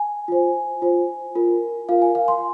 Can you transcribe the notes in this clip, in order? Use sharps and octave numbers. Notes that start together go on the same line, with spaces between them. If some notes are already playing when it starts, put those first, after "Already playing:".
Already playing: G#5
F4 C5
F4 C5
F4 A#4
F4 A#4 F5
G#5
F5
C6